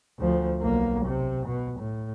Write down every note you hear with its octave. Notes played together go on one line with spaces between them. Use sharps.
D2 F3
B1 A#3
C3
B2
A2